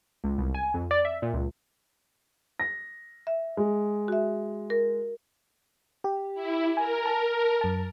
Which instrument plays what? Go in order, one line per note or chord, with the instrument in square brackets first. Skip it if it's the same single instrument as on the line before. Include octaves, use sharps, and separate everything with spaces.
[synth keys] C#2
C2
G#5
F2
D5
E5
A#2
C#2
[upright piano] A#6
[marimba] E5
[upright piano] G#3
[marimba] F#4 E5
A#4
[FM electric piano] G4
[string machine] E4
[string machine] A#4 [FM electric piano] G#5
[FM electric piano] A5
F#2 A5